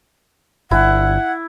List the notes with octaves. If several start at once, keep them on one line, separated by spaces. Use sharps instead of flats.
G1 E4 F#5